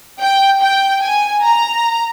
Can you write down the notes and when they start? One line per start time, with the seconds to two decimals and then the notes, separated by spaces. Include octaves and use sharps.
0.21 G5
0.61 G5
1.02 G#5
1.43 A#5